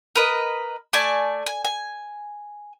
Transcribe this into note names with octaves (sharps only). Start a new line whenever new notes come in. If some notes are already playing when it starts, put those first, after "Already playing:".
A#4 B4 D#5
A3 D5 G#5 A5
G#5
G#5